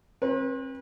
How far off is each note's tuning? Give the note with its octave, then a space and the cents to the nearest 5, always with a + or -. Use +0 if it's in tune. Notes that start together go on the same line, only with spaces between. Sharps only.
C4 +40 B4 -30